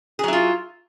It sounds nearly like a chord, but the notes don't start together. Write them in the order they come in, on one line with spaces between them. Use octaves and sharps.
G#4 F#3 E4 F4